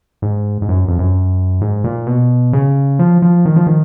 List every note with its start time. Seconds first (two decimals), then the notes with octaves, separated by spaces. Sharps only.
0.22 G#2
0.62 G#2
0.69 F#2
0.88 F2
0.99 F#2
1.61 G#2
1.84 A#2
2.07 B2
2.53 C#3
2.99 F3
3.22 F3
3.46 D#3
3.56 F3
3.67 D#3